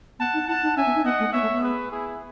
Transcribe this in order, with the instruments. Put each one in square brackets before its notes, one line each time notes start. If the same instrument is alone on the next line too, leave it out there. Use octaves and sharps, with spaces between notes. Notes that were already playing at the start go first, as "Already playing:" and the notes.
[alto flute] B3 [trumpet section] F#5 A5
[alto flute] D#4
[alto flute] E4 [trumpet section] F#5 A5
[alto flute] D#4
[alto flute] C#4 [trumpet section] E5 G#5
[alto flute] B3
D#4
[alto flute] B3 [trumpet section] D#5 F#5
[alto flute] A3
[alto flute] B3 [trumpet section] C#5 E5
[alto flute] A3
B3
[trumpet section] G#4 B4
E4 G#4